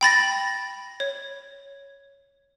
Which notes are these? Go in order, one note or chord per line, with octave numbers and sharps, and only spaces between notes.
G5 B5 A6 A#6
C#5